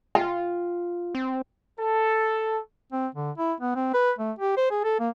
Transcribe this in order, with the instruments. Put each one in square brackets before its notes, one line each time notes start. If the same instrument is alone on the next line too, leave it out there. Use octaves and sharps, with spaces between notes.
[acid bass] F4 [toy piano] G5
[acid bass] C4
[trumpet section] A4
[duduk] C4
D3
E4
B3
C4
B4
A3
G4
C5
G#4
A4
A#3